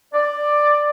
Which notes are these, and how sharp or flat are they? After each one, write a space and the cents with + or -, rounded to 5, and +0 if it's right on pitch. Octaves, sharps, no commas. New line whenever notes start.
D5 +10